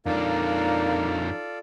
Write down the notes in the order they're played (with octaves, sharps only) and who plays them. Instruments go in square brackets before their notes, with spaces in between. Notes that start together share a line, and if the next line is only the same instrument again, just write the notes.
[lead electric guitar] F2 D4 [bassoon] A#3 [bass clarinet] D#4 [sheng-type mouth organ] F4 A4 D5